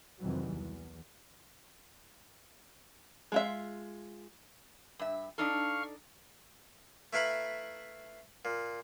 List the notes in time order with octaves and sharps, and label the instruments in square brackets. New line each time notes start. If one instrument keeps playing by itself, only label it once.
[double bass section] C2 F2 D#3 E3 F#3 G3
E2
[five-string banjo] G#3 F4 E5
[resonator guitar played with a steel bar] G2 E5
[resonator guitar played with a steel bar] D4 D#4 A4 [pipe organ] F5 C#6 F6
[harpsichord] A3 E4 B4 F5 A#5 B5
A#2